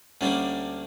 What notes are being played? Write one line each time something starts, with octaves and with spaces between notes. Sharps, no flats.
D2 D3 G3 A#3 C#4 D4